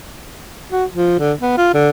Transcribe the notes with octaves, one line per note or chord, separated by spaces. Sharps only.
F#4
F3
D3
B3
F4
D3